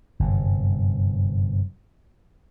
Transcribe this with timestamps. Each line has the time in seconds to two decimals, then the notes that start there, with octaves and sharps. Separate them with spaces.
0.20 G1 F#2 C3